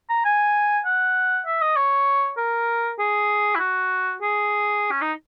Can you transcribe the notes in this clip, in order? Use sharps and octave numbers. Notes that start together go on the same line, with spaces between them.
A#5
G#5
F#5
E5
D#5
C#5
A#4
G#4
E4
F#4
G#4
C#4
D#4